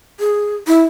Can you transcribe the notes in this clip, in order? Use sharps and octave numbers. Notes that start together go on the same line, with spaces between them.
G#4
E4